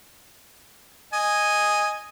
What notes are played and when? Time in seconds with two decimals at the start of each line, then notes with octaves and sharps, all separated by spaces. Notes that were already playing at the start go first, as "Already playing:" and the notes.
1.13 D#5 G#5